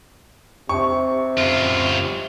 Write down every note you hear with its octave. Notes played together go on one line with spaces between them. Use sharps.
C3 C#6
F#2 F4